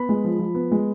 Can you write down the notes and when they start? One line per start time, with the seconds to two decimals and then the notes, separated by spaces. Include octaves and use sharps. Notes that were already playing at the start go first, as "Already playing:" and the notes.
Already playing: B3 B5
0.09 G#3
0.24 F3
0.39 F3
0.55 B3
0.72 G#3